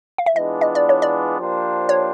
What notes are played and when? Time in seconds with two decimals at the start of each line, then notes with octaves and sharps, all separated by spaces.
0.18 F5
0.26 E5
0.36 E3 G#3 B3 D4 F4 D#5
0.61 D#5
0.75 D5
0.89 C#5
1.02 D5
1.38 F3 A#3 D4 G4 C5
1.89 C#5